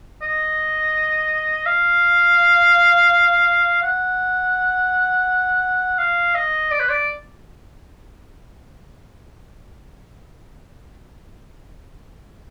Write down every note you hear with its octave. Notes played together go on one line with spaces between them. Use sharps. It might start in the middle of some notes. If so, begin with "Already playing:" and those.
D#5
F5
F#5
F5
D#5
D5
B4
D5